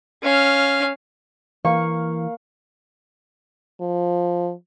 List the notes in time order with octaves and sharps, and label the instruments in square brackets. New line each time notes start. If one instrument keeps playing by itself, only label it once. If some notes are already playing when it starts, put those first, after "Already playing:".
[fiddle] C#4 F5
[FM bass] E3 [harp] A#3 C#6 [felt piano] F5
[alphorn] F3